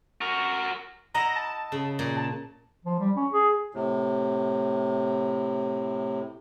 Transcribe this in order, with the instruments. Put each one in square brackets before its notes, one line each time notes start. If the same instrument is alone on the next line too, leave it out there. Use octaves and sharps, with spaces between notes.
[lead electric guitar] F#4 A#4
[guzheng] E4 D#5 F#5 [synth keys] A#5 A#6
[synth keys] A5
[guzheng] C#3
A#2
[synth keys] A5
[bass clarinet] F3
G3
C#4
G#4
[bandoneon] A2 C3